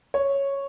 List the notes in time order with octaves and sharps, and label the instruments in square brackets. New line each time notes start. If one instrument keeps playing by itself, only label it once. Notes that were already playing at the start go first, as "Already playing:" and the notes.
[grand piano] C#5